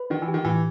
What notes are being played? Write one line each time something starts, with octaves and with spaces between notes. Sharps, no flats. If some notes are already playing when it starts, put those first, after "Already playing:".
Already playing: B4
D#3 D4
E3
G4
D#3
A2 E3